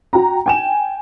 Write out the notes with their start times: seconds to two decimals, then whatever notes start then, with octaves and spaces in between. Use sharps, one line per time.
0.13 F#4 G5 A#5
0.46 G5 G#5 E7